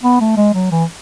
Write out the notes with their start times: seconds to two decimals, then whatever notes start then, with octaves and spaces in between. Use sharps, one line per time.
0.03 B3
0.20 A3
0.37 G#3
0.54 F#3
0.71 E3